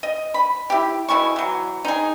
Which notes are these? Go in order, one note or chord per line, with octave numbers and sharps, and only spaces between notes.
D#5
B5
E4 G4
B2 E4 G#4 C#6
E3 F#3
D#4 G#4